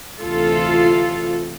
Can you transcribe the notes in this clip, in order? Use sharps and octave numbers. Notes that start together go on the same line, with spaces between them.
D2 C3 E3 F4 A4